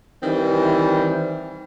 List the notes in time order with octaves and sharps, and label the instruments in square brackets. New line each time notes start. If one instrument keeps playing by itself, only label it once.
[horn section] D#3 E3 G3 C4